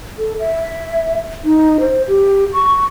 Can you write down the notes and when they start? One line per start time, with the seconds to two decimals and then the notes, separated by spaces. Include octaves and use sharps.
0.18 A4
0.39 E5
1.44 D#4
1.80 C5
2.08 G4
2.53 C#6